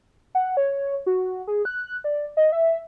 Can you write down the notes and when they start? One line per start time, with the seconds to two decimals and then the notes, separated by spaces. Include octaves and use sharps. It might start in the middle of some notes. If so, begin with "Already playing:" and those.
0.35 F#5
0.57 C#5
1.06 F#4
1.47 G#4
1.65 F#6
2.04 D5
2.37 D#5
2.52 E5